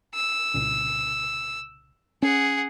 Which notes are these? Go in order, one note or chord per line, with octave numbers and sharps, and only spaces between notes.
E6
C2 A#2 C#3
C#4 G#4 F#5